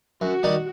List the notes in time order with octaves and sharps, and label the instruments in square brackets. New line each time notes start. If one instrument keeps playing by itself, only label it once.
[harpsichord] F#2 [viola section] F#4
[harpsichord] D#3 G3 D#4